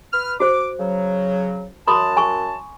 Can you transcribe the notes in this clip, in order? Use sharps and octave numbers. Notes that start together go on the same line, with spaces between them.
B4 F6
F#4 C5 D6
C#3 F#3
F#2 A5 B5 C6 D#6
G#5 C#6